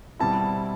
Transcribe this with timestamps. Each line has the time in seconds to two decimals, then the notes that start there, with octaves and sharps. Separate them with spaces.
0.19 B2 G3 C4 E4 A5